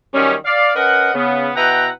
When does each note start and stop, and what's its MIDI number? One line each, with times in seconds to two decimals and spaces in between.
0.14 0.34 42
0.14 0.34 51
0.14 0.34 55
0.14 0.34 61
0.45 0.71 74
0.45 0.71 77
0.76 1.13 61
0.76 1.13 70
0.76 1.13 71
0.76 1.13 75
0.76 1.13 78
1.14 1.49 49
1.14 1.49 59
1.56 1.89 47
1.56 1.89 64
1.56 1.89 71
1.56 1.89 78
1.56 1.89 79
1.56 1.89 82